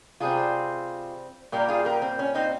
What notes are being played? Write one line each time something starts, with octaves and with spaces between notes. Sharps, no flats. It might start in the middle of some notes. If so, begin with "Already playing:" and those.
C3 G3 C4 F4 G#4
A#2 G3 A#3 G4 A#4
F4 G#4
G4 A#4
C4
C#4
C4 D#4